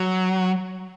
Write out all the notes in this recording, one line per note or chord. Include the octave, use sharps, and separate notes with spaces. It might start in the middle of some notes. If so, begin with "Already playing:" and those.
Already playing: F#3